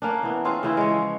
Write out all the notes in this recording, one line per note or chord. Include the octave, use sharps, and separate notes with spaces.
A#3 C#4 D4
E3 B3
C4 C#4 F4 G#4
C#3 E3 E4 F4
G#3 C#5
F3